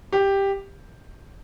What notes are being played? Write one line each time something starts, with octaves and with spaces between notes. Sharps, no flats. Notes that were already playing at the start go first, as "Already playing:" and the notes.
G4